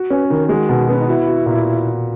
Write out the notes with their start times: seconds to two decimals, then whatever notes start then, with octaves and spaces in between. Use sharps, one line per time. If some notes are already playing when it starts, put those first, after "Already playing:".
Already playing: F#4
0.10 C#4 B4
0.30 D#3 A#4
0.49 G#3 F#4
0.69 B2
0.89 B3 C#4
0.98 D#4
1.08 E4 F#4
1.27 F#4
1.46 A#2